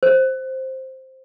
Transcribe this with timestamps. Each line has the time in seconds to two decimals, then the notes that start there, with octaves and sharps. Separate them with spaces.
0.03 C5